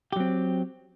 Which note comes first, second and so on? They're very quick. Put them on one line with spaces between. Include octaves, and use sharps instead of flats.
G4 F#3 C4